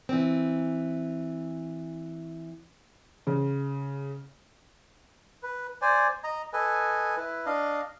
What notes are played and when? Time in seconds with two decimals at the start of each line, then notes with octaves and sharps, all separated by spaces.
0.09 E3 C4
3.27 C#3
5.43 B4
5.82 C5 D5 G#5
6.24 D#5 A#5
6.53 A4 B4 D#5 G#5
7.17 E4 B4
7.46 D4 D#5 F5